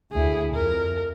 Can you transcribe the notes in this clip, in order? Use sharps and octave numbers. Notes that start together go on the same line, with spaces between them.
D2 E4 G#4
F2 A#4